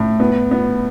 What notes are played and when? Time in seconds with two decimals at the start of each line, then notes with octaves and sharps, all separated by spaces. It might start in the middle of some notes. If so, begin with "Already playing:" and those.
Already playing: A2
0.20 B3
0.51 B3